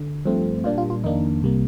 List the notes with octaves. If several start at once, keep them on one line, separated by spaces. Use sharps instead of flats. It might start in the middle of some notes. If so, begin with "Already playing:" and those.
Already playing: D3
G2 F3 A3 C4
A#2 G3 A#3 D4 F4
F4
F4
F2 D#3 A#3 D4 D#4
C2 C3 G3 A#3